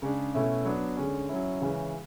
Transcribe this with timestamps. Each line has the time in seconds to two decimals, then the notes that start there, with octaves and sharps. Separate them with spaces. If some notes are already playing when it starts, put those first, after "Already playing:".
0.02 C#3 G#3 D4
0.34 B2 A3 C#4 E4
0.65 F#3 B3 D4
0.97 D3 G#3 C#4
1.29 F#3 C#4 E4
1.61 C#3 E3 G#3 C#4